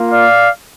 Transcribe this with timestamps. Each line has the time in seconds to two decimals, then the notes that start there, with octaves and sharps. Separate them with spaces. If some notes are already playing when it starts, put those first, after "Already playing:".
Already playing: A#3 F4
0.10 D5 F5